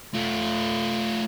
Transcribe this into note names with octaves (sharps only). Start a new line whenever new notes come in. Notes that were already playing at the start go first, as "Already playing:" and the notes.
A3 F4